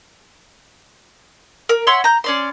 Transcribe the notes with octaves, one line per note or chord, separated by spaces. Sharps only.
A#4
C#5 E5 F#5 C6
A#5 G6
C#4 D5 C6